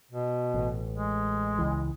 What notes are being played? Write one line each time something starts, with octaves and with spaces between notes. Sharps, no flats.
B2
A1
G#3
C#2 E3